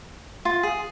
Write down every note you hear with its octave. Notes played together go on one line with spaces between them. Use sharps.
F4
G#4